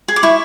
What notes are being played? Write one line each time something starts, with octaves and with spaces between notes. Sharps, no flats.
G#4
D6
E4 C#6